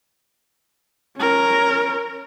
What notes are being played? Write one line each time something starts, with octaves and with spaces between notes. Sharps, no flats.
C#4 A#4